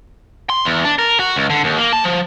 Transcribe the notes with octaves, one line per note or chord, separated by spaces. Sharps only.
C6
E2
D4
A#4
F#4
C#2
D3
D#2
A#3
A5
F3